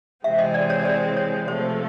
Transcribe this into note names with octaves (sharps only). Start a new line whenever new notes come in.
C3 E3 G#3 C4 E5
D#5
D5
C#5
D5
C#5
C3 F3 A3 C5